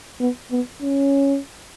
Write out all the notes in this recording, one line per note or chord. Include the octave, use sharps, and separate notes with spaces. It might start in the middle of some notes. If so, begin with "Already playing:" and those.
B3
B3
C#4